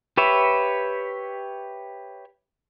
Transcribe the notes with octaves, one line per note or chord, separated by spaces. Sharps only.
G4 B4 C#5 E5